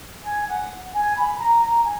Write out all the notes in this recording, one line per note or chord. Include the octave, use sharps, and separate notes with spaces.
G#5
F#5
F#5
G#5
B5
A#5
A#5
G#5